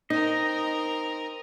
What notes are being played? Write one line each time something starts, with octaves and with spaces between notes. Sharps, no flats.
C4 D#4 A#4 D#5